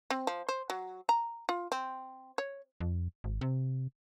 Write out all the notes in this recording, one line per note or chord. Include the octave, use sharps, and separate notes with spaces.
C4
F3
C5
F#3
A#5
F4
C4
C#5
F2
G#1
C3